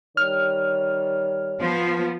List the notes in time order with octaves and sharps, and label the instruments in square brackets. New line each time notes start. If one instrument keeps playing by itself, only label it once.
[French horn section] D#3 G3 C#5 [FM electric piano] F6
[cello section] F3 B3